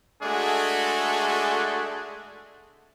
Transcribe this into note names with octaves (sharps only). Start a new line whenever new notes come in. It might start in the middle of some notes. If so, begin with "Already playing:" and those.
G#3 A3 D4 F#4 G#4 A4